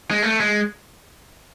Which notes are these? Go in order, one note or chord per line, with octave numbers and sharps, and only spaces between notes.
G#3
A3
G#3